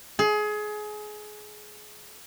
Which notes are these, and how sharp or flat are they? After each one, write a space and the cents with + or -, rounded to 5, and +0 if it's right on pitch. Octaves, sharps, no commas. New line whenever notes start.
G#4 +25